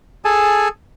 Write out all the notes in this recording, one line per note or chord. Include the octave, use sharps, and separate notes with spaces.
G#4 A4 G#5 A5